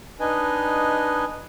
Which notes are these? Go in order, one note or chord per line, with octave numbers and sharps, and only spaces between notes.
D4 D#4 B4 D#5 G#5